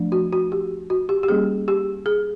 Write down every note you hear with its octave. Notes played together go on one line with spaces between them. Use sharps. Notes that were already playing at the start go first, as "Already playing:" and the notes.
Already playing: F3 A3 D4
F#4
F#4
G4
F#4
G4
G4
G3 A#3 C#4 G#4
G4
G#4